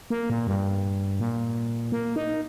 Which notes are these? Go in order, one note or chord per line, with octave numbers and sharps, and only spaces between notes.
A#3
A#2
G2
A#2
A#3
D#4